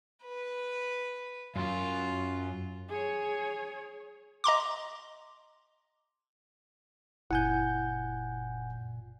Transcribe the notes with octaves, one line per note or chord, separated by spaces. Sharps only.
B4
F#2 F#3 F4
G#4 C#5
D#5 A#5 C6 D6
F#1 A#2 E4 F#5 G#5 G6